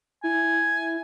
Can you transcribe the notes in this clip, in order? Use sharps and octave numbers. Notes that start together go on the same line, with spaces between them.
E4 G#5